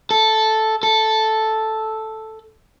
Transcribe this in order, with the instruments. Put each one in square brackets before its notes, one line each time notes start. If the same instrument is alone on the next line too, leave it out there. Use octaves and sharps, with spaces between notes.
[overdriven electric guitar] A4
A4